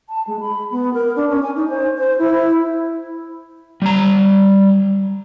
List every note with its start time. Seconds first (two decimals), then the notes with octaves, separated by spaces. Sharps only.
0.09 A5
0.27 G#3
0.41 B5
0.72 B3
0.94 A#4
1.16 D4
1.29 C#4
1.43 G#5
1.56 D#4
1.69 C5
1.98 C5
2.19 E4
3.82 G3 A#5